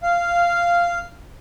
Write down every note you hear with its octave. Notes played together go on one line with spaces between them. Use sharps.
F5